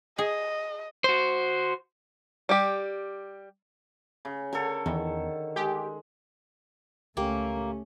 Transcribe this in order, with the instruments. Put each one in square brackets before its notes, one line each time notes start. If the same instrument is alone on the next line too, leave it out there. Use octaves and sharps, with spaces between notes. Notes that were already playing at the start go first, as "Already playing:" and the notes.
[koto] G#4 [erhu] D#5
[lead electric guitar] F#4 C5
[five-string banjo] G3 G4
[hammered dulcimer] C#3
[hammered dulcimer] D3 A4 [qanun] A#4 C#5
[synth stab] E2 [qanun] D#3
[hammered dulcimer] G#3 [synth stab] G4
[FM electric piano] C#2 G4 [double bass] A3 C#4 [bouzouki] A#3